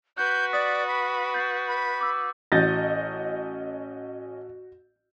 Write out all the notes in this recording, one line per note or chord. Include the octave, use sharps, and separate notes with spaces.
F#4 B4 F#6 G6 B6
D5 D#6 A6 B6
B5
G6 A6 C7
B5
D6 E6
A1 C#4 F#4 D#5 D#6 G6 A6 A#6